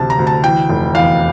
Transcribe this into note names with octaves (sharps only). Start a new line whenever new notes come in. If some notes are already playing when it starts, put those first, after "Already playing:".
Already playing: D2 C3 E3 A5
A#5
D2
A5
E3 G5
F1
E2 F5